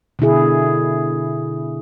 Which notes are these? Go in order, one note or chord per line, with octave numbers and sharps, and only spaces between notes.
B2 D3 E4 G#4